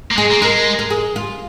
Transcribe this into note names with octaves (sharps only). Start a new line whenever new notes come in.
A#3
G#3 G#4
A#3
G#3 A#4
A#4
G#4
F4